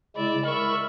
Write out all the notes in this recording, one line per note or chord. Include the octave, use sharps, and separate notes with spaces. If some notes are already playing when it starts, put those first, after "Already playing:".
C#3 G#3 E4 D5 E5
A#4 E5 B5 C#6